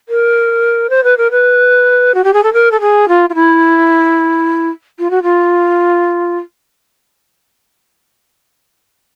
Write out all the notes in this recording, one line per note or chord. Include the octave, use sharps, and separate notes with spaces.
A#4
C5
B4
A#4
B4
F#4
G4
G#4
A4
A#4
A4
G#4
F4
F4
E4
F4
F#4
F4